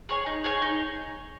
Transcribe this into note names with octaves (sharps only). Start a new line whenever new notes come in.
G#4 C#5 G#5
D#4
G#4 C#5 G#5
D#4